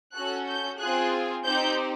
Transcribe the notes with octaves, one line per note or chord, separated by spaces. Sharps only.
C#4 F#4 A4 F#6
G6
C4 F4 G#4 F#6
C4 D#4 G4 G6